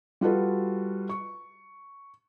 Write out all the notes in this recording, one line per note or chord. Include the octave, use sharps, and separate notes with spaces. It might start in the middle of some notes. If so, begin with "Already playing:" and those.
G3 F4 F#4 A4 B4
C#6